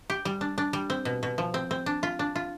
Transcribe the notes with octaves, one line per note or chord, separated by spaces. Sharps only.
G4
G3
D4
D4
G3
C4
B2
B2
F3
C4
C4
D4
F4
D4
F4